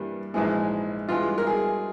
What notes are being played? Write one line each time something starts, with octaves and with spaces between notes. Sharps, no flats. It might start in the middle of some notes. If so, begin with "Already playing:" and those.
Already playing: G2 E3 G3 A#3
A#1 G#2 E3 G#3
G2 E3 G#3 F4
A#4
G#4